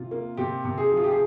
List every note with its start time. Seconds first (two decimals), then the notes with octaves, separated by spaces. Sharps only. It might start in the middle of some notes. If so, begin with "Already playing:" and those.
Already playing: C3 F4
0.11 A#3
0.37 C3 G4
0.65 C3
0.78 G#4
0.92 F3
0.97 F4
1.04 G4
1.11 G#4